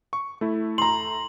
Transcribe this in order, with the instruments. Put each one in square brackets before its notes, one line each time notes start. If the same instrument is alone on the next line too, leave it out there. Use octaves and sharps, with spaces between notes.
[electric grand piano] C#6
A3 E4
[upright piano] A#5 C6 [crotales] F#7